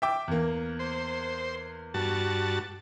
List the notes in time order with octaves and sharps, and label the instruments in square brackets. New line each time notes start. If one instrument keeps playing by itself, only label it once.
[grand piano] E5 G5 D6
E2 A#3
[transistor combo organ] C5
G2 F#4 A5